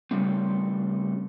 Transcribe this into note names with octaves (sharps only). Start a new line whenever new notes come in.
C#3 G3 A3 C4